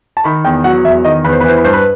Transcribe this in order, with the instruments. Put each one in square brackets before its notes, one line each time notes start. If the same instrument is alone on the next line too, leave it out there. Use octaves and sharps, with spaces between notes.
[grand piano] A5
D#3 B5
E2 G5
F#3 F#5
E2 E5
D#3 D#5
E2 B4
C5
B4
E3 C5
B4
G2 C5
B4